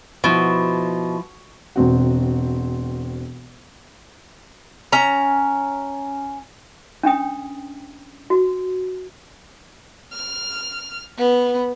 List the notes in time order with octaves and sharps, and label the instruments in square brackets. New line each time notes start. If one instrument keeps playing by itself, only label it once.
[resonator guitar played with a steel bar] B2 [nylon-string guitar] F3 E4
[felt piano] E1 C4 F#4
[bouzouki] C#4 A#5
[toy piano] C#4 D4 G5 D#6
F#4
[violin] F6
B3